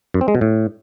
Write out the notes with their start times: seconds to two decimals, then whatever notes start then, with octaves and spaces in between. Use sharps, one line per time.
0.14 F#2
0.21 C4
0.28 G#3
0.35 B2
0.41 A2